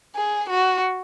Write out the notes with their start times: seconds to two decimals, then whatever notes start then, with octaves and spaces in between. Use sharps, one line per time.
0.15 G#4
0.49 F#4